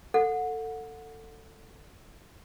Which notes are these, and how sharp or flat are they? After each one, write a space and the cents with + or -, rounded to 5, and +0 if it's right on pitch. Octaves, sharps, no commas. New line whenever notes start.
A4 +20 F#5 -25